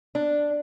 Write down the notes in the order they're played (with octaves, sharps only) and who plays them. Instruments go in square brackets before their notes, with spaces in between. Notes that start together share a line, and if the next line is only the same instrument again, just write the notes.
[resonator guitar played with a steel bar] D4